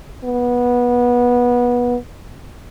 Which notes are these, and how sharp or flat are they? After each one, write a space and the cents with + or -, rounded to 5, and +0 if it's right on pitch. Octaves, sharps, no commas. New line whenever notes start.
B3 -20